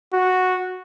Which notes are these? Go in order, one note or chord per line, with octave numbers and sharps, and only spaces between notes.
F#4